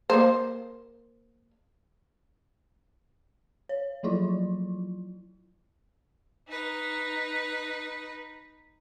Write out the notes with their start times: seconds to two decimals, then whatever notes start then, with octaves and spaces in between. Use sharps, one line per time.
0.10 A#3 C5
3.69 C#5
4.03 F3 F#3 E4 F4
6.48 D#4 B4